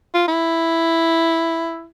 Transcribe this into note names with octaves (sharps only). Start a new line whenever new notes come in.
F4
E4